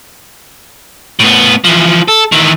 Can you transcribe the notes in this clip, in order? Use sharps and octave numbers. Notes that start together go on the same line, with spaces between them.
A2 B3
E3 F3
A4
D#3 E3